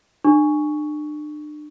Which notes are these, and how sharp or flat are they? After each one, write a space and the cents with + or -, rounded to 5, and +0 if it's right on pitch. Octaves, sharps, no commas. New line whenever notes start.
D4 +40 C#6 +10